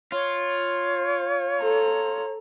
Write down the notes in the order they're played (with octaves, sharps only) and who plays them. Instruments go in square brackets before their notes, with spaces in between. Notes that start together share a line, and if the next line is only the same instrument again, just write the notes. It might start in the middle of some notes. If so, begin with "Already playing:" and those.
[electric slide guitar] F4 [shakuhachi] C#5
[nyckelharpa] A4 A#5